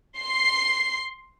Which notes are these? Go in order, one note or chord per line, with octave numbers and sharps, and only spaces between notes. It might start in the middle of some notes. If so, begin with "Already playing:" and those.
C6 C7